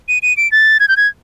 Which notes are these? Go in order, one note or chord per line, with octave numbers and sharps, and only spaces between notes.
D#7
D#7
D7
A6
G#6
G6
G#6